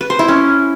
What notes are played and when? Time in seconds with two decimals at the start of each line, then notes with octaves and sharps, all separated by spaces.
0.01 B4
0.10 C5
0.19 E4
0.28 C#4